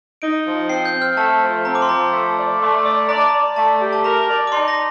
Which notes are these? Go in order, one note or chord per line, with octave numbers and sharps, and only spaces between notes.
D#4 D7
F3
C4 C7
G6
C4
F6
A3 A5
F3
C4 A#5
D6
C6
F3 A#5
A3
D5
A3
D5
D5 A#5
A5
D5 A#5
A3 A5
G4
A5
A#4 A#5
D5
D6
D#4 C6
A#6